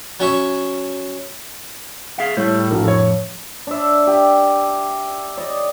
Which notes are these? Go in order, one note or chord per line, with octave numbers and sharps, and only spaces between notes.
F#3 C#4 C#5 E5 C#6
G#4 E5 F5
A2 G3 A3
A#1 F2 F#4 A#4
F2 A4 C#5
D4 E5
G4
D5 D#5